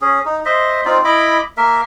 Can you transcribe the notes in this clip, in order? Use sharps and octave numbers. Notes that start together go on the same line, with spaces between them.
C#4 G#4
D#4
C5 D#5 E5
C4 D#4 F4 D5
E4 D#5 B5 D6
A#3 A#4 E5